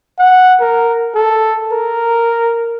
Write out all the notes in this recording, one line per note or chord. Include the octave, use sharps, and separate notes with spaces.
F#5
A#4
A4
A#4